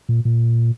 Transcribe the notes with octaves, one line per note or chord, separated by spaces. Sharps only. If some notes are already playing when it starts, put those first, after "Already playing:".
A#2
A#2